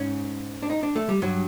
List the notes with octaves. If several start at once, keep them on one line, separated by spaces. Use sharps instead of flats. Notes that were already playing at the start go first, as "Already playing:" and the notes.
Already playing: G#2 C#4
D4
D#4
D4
A3
G3
G2 F#3